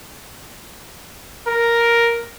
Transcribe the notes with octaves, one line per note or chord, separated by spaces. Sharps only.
A#4